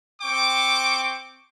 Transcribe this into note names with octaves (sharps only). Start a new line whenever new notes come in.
C4 G5 C#6 D6